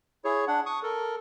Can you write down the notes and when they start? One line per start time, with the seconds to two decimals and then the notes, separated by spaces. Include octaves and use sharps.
0.25 E4 G#4 C#5
0.48 D4 F#5
0.66 C#6 D#6
0.83 A4 A#4